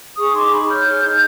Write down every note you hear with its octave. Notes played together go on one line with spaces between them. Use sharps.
G#4 C#6 D#6
D#4 C6 D6
D#4 B5 C#6
C#5 F6 G6
G#4
D#4